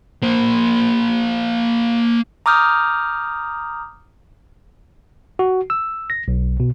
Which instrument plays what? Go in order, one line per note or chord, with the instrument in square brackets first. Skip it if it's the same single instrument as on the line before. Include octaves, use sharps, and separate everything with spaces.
[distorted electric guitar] A#3 C5
[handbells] A#5 D6 D#6 F6 G6
[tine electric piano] F#4
E6
A#6
B1
B2